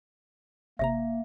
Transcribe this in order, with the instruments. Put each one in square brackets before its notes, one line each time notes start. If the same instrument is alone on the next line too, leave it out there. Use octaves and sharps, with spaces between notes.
[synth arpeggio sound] G#1 C3 A#5 [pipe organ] A#3 [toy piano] E5